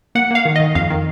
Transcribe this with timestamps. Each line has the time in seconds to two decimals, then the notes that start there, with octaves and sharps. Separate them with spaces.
0.15 A#3 F#5
0.31 A#3 F5
0.45 D#3
0.56 D#3 D#5
0.75 F2 F5
0.90 D#3